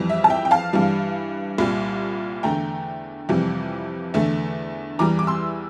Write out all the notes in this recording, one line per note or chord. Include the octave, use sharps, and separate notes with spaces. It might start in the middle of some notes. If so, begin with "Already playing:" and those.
Already playing: F2 E3 G3
E5
A5
E5 G5
G5
F5 A5
G2 E3 G3
C2 A#2 G3
E2 D3 A3 G5 A#5
F2 C3 E3 G3
E2 D3 A3
E2 E3 G3 A#5 D6
D6
C6 E6